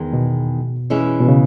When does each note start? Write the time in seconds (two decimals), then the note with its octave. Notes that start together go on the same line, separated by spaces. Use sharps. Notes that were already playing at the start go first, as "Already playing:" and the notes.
Already playing: E2 D#3 G#3
0.13 B2
0.90 E3 G#3 C#4 E4
1.21 B2
1.28 C#3